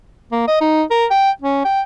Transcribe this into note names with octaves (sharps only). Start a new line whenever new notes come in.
A#3
D#5
D#4
A#4
G5
C#4
G5